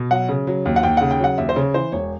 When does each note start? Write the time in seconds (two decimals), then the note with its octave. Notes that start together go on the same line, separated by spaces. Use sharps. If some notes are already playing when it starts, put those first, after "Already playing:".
Already playing: B2
0.11 F#3 F#5
0.29 C#3
0.47 F#3
0.66 D#2
0.76 F#5
0.83 D#2 G5
0.97 C#3 F#5
1.11 G5
1.20 F#3 F#5
1.38 D#2 E5
1.49 C5
1.56 C#3 C#5
1.74 E3 C5
1.92 E1 C#5